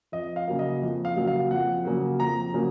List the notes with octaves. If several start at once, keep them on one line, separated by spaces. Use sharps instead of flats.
F2 D#5
F5
C#3 F#3 A#3
D#5
F2
F5
C#3 F#3 A#3
F5
F2 F#5
C#3 F#3 A#3
F2 A#5
C#3 F#3 A#3